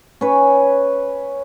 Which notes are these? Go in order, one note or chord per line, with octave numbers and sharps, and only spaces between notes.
C#4 B4 C#5